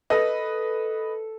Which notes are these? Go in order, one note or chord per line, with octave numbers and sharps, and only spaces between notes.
A4 B4 D#5